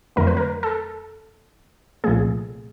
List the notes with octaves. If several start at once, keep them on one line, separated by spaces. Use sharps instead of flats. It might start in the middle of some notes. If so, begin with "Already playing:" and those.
F2 D3 F#3 A3 A#4
B4
A#4
A4
C2 A#2 F3 A3 G#4